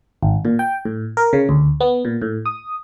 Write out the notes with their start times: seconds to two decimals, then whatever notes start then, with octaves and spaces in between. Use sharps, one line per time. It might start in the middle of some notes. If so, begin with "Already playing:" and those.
0.23 G#1
0.45 A#2
0.59 G5
0.85 A2
1.17 A#4
1.33 C#3
1.49 D2
1.80 B3
2.05 A#2
2.22 A2
2.46 D#6